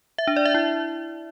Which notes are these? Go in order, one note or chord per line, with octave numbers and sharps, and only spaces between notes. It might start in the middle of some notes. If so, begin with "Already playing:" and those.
E5
D4
D5
E5
E4